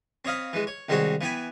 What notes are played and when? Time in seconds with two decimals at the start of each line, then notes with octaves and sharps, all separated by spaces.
0.25 C4 C#5 D#5 F5 B5
0.53 E3 G#3
0.67 C#5
0.89 C2 D#3 G#3 C4 F#4 C#5
1.21 E3 B3 G5 G#5 B5